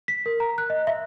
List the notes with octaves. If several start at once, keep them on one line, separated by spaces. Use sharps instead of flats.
B6
A#4
A#5
F#6
D#5
E5